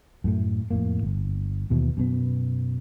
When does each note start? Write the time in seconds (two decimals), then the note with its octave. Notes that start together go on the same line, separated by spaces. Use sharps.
0.24 F#2 A2 A3
0.71 F2 A2 A#3
1.03 G1
1.70 D#2 B2 E3
1.97 F#2 B2 B3